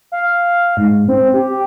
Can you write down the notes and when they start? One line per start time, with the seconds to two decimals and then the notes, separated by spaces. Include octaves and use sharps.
0.12 F5
0.77 G#2
1.08 C4
1.34 G4